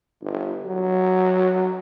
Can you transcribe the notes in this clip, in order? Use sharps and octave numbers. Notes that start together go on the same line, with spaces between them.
G1
F#3